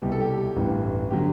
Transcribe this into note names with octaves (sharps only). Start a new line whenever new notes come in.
C2 B2 G3 G4
A4
G4
A1 G2 E3
D3 F#3 G4